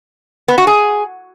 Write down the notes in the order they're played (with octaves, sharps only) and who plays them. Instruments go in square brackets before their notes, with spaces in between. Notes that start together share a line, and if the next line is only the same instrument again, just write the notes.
[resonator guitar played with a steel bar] B3
F#4
G#4